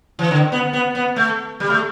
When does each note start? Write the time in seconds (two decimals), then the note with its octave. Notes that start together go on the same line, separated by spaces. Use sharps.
0.19 E3
0.31 D3
0.52 B3
0.73 B3
0.95 B3
1.16 A3
1.60 G3
1.70 A3